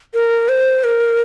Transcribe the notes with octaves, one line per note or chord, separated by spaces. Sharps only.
A#4
C5
A#4